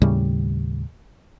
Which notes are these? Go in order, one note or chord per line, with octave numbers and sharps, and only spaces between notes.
D#2 A2 C#3 G3